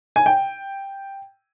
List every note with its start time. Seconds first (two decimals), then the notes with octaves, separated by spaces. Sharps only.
0.16 G#5
0.26 G5